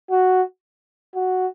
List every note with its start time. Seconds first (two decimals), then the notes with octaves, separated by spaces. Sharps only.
0.10 F#4
1.15 F#4